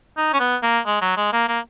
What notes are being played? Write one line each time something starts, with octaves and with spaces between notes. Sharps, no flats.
D#4
C#4
B3
A#3
G#3
F#3
G#3
A#3
A#3